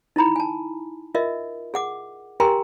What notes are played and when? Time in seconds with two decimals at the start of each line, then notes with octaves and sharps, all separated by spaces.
0.16 D#4 E4 A#5 B5
0.36 G#5 A5
1.15 F4 A#4 D#5 E5
1.74 G#4 F#5 D6
2.40 G4 A#4 G5 G#5 A#5 C6